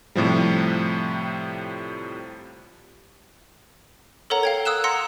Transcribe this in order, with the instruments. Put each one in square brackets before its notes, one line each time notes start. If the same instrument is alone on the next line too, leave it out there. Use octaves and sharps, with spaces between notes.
[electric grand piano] A2 C3 F3 G3
[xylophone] A4 A#4 C#5 F#5 A#5
F5 G5 G#6
D#6 E6 F#6 E7
F#5 A#5 C6 E6 A#6 C#7